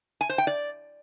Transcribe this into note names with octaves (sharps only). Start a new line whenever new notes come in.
G#5
C5
G5
D5